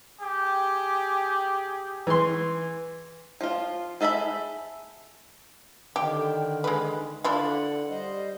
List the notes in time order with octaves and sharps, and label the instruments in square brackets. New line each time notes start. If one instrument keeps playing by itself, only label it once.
[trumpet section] G4 G#4
[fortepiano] E3 C6
[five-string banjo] F3 F4
G#4 A4 E5 A5 B5
[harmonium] D3 D#3 [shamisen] G4
[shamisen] G#3 B4
[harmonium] D3 F#5 [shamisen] D4 E4 F4
[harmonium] G3 C5 D#5